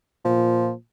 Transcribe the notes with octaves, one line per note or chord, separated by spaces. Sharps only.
A#2 F3